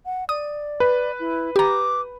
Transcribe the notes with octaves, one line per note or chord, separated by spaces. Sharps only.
F#5
D5 D#6
B4
E4
G4 A#5 D6